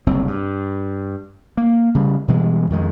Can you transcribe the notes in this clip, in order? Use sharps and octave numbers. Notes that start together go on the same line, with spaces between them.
F#1 C2 C4
G2
A#3
C#3 G3
B2 E3 G3 G#3
F2 D#3 G#3